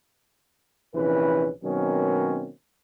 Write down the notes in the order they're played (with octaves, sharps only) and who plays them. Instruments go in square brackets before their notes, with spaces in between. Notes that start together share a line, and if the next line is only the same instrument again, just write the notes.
[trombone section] A#1 C3 E3 C#4 B4
B2 D#3 F#3 A#3 C4 C#4